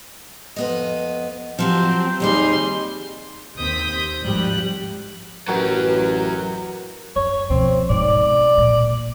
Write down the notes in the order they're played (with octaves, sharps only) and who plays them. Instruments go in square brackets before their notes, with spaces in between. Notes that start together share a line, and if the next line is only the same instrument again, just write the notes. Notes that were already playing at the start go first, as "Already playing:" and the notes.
[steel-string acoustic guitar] F2 B3 D#5
[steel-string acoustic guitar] F3 F#3 G4 [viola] C4
[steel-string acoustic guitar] D#2 D#4 G#4 [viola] G3 C6
[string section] D#2 C4 D#6 G6 B6
G#1 F3 G3 G4 F#6
[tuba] A1 [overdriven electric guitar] F#2 F#3 [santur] F#4 A#4 G5 [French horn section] B4
[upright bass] F#2 [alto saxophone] C#5
[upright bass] B2 F3 [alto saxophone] C4
[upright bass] G#2 B2 [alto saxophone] D5
[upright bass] A#2